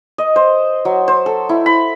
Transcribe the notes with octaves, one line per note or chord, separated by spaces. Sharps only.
D#5
C5
F#3
C5
A4
E4
B5